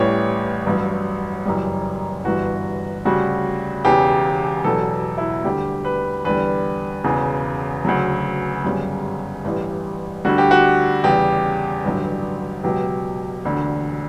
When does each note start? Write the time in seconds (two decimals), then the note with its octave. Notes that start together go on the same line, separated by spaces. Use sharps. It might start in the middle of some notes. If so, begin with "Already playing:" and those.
Already playing: A1 A2 E3 G3 C#5
0.66 A1 G2 F#3
1.45 F#1 F#2 E3 G3
2.25 G1 G2 E3 F#4
3.05 D2 C#3 G3 F#4
3.85 E1 E2 C#3 G4
4.64 E1 E2 B2 F#3 A4
5.18 E4
5.44 D2 D3 G3 G4
5.85 B4
6.24 E2 D3 G3 B4
7.04 E1 E2 C#3
7.85 D2 C#3 F#3
8.64 G1 F#2 C#3 G3
9.45 A1 G2 E3 G3
10.25 D2 D3 G3 F#4
10.38 G4
10.51 F#4
11.04 E2 C#3 G3 G4
11.84 A1 G2 D3 F#3
12.64 C#2 B2 F#3 G4
13.44 E1 D2 D3